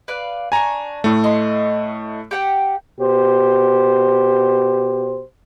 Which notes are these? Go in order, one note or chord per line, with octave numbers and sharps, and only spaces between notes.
B4 D5 F5
D4 G#5 A#5 C#6
A2 A3
D#5 C6
G4 F#5 G5
B2 G4 C5